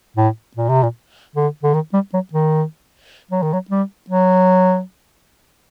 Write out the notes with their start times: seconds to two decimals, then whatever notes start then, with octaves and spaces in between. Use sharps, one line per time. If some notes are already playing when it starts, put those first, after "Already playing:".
0.17 A2
0.56 A#2
0.69 C3
0.83 A#2
1.35 D3
1.63 D3
1.74 D#3
1.93 G3
2.13 F#3
2.33 D#3
3.31 F#3
3.42 D#3
3.53 F#3
3.70 G3
4.10 F#3